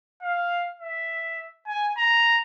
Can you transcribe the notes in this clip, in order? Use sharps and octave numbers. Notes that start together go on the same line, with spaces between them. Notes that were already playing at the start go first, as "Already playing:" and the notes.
F5
E5
G#5
A#5